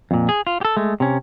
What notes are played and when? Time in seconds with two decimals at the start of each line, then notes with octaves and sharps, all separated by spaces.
0.11 F2 A#2
0.29 G#4
0.47 F4
0.61 G4 A4
0.77 G#3 A3
1.00 C3 C#4